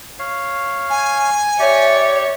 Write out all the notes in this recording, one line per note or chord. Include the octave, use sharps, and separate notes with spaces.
C#5 F5
G#5
G4 C#5 D5 E5